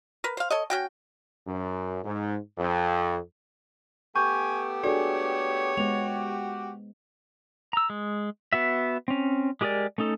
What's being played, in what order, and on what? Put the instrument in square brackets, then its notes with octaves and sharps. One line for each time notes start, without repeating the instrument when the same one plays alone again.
[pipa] A#4 B4
C5 F5
A4 C#5 D#5
C#4 F#4 G5
[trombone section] F#2
G#2
F2
[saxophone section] A3 B3 G4 [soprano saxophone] G#5 [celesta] C#6 G6
[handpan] D4 G#4 [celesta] F#4 A4 D5 [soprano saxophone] C#5
[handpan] G#3 B3 C5 [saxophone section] F#4 G4 [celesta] F7
[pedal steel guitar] A#5 E6
G#3
B3 F#4 E5
C4 C#4
G#3 G4 G#4 A#4 D5
A3 C#4 D#4 A4